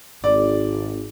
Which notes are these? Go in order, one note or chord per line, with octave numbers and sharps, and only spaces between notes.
G#1 D5